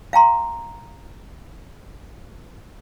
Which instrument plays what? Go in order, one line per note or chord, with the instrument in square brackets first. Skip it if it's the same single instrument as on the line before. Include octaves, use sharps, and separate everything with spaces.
[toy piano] F5 G5 A#5 C6